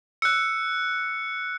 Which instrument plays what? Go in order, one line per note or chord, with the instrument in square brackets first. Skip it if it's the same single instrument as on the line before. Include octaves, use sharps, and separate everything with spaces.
[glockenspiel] E6 [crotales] F#6 C#7